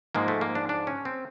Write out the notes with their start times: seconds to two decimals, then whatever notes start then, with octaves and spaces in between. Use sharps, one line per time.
0.15 G#2 F3 G#3 A#3
0.28 A3
0.41 A#3
0.55 D4
0.69 D4
0.87 C#4
1.05 C4